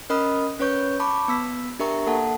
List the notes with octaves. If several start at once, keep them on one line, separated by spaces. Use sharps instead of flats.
C#4 A#4 D#5 B5 D#6 F6
C#4 B4 C#5 C#6 G6
A5 B5 C#6 D6
B3 E6 B6
D4 G4 A#4 E5 A#5 C#6
A#3 A4 F#5 A5